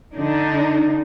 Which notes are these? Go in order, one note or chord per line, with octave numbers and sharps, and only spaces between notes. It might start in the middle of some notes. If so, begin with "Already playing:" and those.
D3 D4 D#4